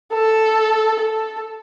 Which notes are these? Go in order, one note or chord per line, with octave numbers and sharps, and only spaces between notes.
A4
A4